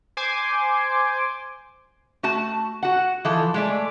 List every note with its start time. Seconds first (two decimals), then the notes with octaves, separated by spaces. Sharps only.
0.17 C5 G#5 C6 D6
2.23 A3 F#4 A5
2.83 F#4 F#5
3.25 E3 F3 A4
3.54 G#3 A3 D5